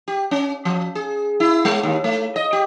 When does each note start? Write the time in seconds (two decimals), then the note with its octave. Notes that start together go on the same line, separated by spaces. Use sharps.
0.08 G4
0.31 C#4
0.65 F3
0.95 G#4
1.40 E4
1.65 G#3
1.83 D#2
2.04 A3
2.36 D#5
2.53 G4